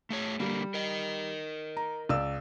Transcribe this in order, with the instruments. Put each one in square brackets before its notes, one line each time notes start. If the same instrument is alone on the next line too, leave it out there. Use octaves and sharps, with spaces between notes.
[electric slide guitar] A3 G#4 C#5
[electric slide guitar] D3 A#3 A#4 [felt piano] G3
[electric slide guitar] A#4 D#5
[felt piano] A#5
C#2 D5 E6